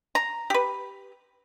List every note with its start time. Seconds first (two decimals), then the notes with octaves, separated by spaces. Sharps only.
0.15 A#5
0.50 G4 B4